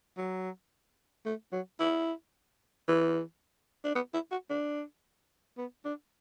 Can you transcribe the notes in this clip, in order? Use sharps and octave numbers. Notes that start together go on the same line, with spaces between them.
F#3
A3
F#3
E4
E3
D4
B3
E4
F#4
D4
B3
D4